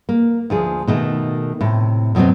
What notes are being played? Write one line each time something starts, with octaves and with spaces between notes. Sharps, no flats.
A#3
D2 F3 G#4
B2 D#3 A3
A2 C3
F#2 B2 F#3 B3 C4